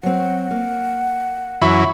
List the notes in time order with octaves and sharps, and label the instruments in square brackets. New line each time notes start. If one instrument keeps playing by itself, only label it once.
[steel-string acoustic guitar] F#3 C4 [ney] F#5
[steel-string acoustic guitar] A#3
[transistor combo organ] F#2 E3 [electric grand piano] E5 B5 C#6